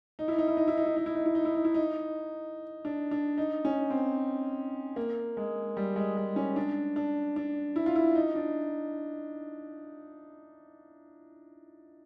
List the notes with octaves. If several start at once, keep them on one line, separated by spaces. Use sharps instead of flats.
D#4
E4
D#4
E4
D#4
E4
D#4
E4
D#4
E4
D#4
E4
D#4
E4
D#4
E4
D#4
D4
D4
D#4
C#4
C4
A#3
G#3
G3
G#3
G#3
C#4
D4
D4
D4
E4
F4
E4
D#4
D4